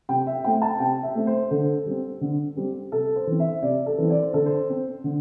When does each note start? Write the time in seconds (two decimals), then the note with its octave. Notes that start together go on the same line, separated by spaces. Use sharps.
0.09 C3 G5
0.27 E5
0.44 A3 C4 G5
0.62 A5
0.80 C3 G5
1.03 E5
1.15 A3 C4
1.27 C5
1.50 D3 A4
1.86 G3 C4
2.21 D3
2.56 G3 C4
2.92 C3 A4
3.16 C5
3.27 E3 C4
3.40 E5
3.62 C3 D5
3.86 A4
3.98 E3 C4
4.10 D5
4.22 C5
4.34 D3 A4
4.46 C5
4.69 C4
5.04 D3